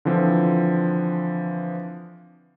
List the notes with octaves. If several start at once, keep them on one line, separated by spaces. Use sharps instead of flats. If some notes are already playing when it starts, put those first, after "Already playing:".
D3 E3 F3 C4